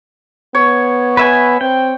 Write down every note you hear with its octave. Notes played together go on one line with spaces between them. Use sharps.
B3 C#5
B4 E5 G#5
C4 G5